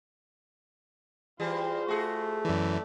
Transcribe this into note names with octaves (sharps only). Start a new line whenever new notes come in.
E3 G3 F4 G#4 C5
A3 F#4 G#4
F#2 E3 D5